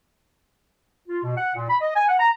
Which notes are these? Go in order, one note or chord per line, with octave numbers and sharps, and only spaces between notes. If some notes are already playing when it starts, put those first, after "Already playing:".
F4
B2
F#5
A#2
B5
D#5
G#5
F#5
A#5